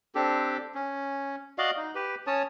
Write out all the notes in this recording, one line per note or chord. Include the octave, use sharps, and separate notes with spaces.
C4 D4 G4 A4
C#4
F#4 D5 D#5 F5
D#4
G4 B4
C#4 C#5 A5 D#6